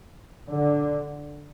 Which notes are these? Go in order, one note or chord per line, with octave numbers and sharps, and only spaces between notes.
D3